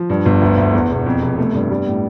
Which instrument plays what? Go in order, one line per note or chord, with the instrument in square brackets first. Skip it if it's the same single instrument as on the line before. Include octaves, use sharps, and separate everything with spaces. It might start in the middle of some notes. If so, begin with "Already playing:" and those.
Already playing: [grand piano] F3
G2
G1
D2
D2
E2
E1
F2
F1
A3
G2
G3
A2